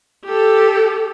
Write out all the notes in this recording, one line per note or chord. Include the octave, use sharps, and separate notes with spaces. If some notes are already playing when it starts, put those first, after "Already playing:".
G4 A4